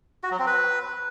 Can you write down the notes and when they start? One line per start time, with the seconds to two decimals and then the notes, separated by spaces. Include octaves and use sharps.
0.23 F#4
0.31 F#3
0.39 C4
0.47 B4